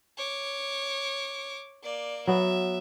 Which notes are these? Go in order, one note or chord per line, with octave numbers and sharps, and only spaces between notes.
C#5 D6
A#3 D5
F#3 B3 E5